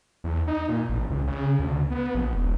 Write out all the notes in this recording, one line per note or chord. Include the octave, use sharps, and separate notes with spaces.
E2
D#4
A#2
A1
C#2
C#3
D2
B3
A#1
E1